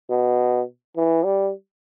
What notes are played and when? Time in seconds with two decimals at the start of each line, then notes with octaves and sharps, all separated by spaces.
0.10 B2
0.97 E3
1.25 G3